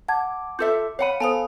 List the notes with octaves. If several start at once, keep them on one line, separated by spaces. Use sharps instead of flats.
F#5 A5 D6 G#6
F4 A4 E5 G6
C#5 F5 F#5 B5 D#7
B3 A4 C5 F5 G#5 D#6